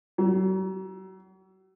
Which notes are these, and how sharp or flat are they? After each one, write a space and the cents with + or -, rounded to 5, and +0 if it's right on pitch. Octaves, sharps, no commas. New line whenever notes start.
F#3 +40